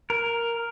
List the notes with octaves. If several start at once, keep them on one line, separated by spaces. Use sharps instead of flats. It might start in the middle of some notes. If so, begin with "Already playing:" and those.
A#4